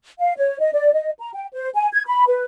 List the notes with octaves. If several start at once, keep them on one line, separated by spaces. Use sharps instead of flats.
F5
C#5
D#5
D5
D#5
A#5
G5
C5
G#5
G#6
B5
B4